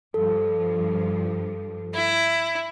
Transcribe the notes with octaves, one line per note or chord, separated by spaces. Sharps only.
G2 F3 A4
E4